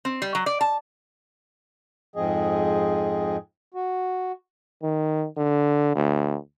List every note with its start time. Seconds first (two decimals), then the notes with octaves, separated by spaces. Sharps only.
0.05 C4
0.22 G3
0.35 F#3
0.46 D5
0.61 A5
2.16 F2 G#2 F3 C4 G#4 D#5
3.74 F#4
4.82 D#3
5.37 D3
5.95 D2